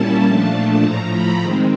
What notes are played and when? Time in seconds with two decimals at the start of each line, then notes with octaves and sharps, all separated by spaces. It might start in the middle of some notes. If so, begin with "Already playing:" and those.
Already playing: A#2 G3 A#3 C#4 E4 A5
0.25 A#2 F3 A3 D4 A5
0.84 A2 F3 A3 A#5
1.13 B5
1.42 D#3 G#3 C4